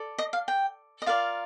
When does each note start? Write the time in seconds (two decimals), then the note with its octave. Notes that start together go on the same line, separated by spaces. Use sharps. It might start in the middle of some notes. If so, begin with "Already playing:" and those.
Already playing: A4 D5
0.18 D#5
0.33 F5
0.48 G5
1.02 D#5
1.06 F4 A#4 D5 F5